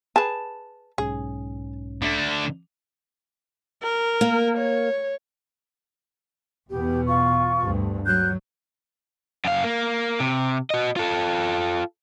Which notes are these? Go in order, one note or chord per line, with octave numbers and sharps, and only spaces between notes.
G#4 B4 A5
B1 G#2 C#4 G#4
D3 A3 D4
A#4
A#3
C#5
E2 B2 B3 G4
F4 C#6
D2 G2
F#3 F#6 G6
F#2 F5
A#3
C3
F#4 D#5
F4 A4